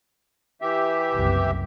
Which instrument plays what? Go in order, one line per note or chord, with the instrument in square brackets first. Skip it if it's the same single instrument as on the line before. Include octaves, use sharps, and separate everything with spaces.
[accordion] E3 G4 E5
[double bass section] F#1 C2 F#2